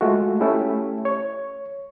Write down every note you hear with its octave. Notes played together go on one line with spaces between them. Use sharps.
G#3 A3 F4 F#4
A3 C#4 E4 G4
C#5